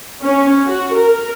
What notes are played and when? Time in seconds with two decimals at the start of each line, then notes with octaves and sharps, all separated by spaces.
0.22 C#4
0.67 F#4
0.96 A#4